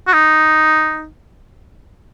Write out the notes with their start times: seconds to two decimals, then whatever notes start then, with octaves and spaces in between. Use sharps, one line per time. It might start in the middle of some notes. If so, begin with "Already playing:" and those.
0.07 F#4
0.14 D#4